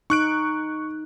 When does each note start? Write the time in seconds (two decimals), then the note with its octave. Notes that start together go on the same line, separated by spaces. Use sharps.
0.10 D#4 C#6 F#6 D7